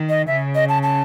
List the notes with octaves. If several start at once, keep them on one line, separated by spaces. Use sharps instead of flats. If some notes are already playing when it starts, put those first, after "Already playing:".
Already playing: D#3
D#5
C#3 E5
D#5
A5
A5